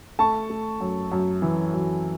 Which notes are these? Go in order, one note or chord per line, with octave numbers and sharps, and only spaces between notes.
A3 A5 C#6
A3
F#2
F#2
E3
F#2